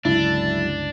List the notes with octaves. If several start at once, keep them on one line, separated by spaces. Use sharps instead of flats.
G1 C#2 C#3 F#3 G#3 D4 E4 A6